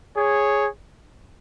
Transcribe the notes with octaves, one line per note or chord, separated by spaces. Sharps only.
G#4 C#5